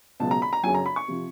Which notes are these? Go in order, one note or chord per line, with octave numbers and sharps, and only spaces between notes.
C#2 B2 F#3 A5
A#5
B5
A#5
F#2 C#3 F#3 G#5
A#5
B5
C#6
C3 F3